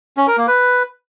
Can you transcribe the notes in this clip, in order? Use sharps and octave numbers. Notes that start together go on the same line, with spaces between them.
C#4
A#4
A#3
B4